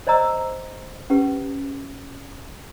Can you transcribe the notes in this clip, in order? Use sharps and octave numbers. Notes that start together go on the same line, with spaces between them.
C5 D5 D#5 A#5 E6
C#4 G4 B4